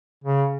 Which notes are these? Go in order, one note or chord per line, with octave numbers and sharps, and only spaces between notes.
C#3